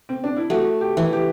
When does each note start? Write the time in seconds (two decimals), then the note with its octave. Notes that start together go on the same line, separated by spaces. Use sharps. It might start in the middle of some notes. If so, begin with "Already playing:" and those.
0.09 C4
0.24 D4
0.37 E4
0.50 A3 F#4
0.81 G4
0.97 E3
1.13 G4